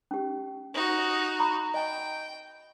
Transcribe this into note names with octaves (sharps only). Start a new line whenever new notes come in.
C#4 G4
D#4 F#4
A#5 B5 C#6
D#5 G5 G#5